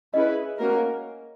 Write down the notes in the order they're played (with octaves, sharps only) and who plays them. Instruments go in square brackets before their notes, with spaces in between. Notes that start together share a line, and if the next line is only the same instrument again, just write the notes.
[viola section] C#4 E4 G#4 B4 [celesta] D#5
[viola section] A#3 C#4 F#4 A#4